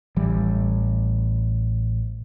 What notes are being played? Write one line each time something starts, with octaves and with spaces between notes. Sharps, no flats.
A1 E3 G3